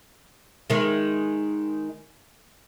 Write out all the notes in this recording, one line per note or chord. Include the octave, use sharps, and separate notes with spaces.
D#3 G#3